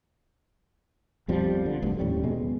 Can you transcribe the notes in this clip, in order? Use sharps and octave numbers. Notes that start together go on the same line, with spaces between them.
B1 F2 F3 G3
D3
F1 D2 G2
D#2 A2 G3 C#4
B2 F#3 G#3